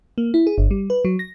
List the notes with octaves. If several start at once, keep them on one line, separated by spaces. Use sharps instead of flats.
A#3
E4
G#4
G1
G3
B4
F#3
A#6